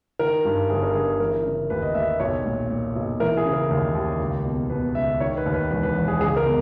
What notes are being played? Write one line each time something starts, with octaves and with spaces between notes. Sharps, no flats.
D#3 A#4
G2
G1 G#4
A#4
G1 G#4
E3 A#4
C#3
D#2 B4
D#5
D#2 E5
B1 C#5
A#2
A#2
B1
E3 A#4
G#4
C#3
A#4
D#2
D#2
C#2
B2
B2 B4
C#2 E5
D#3 C#5
B4
D#2
B4
E1 B4
B4
E1
G#4
C#2 G#4
A#4
B2